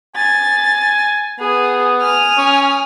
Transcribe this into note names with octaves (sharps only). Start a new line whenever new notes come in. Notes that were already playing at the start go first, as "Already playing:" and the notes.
G#5 A6
B3 G#4
G#5 D#6 F6
C#4